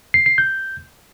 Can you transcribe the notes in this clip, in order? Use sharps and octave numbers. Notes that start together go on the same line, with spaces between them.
C7
C7
G6